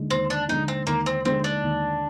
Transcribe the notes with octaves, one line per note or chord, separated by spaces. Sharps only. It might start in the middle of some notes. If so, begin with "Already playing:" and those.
Already playing: D#2 D3 G#3
D#2 C4
D4
D3 G#3 D#4
C4
D#2 A#3
C4
D3 G#3 C4
D4
D#2